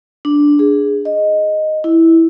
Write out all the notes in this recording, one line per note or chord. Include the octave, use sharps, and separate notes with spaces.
D4
G#4
D#5
E4